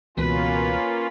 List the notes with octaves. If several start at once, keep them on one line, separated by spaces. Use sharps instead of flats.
C#2 B2 E3 A#3 C#4 F4 B4